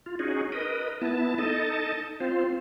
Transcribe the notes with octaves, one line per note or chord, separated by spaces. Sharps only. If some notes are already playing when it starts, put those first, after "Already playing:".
F4
C#4 D#4 F#4 G#4
A#4 B4 D#5
B3 E4 A5
D#4 A4 D#5 A5
C4 F4 C5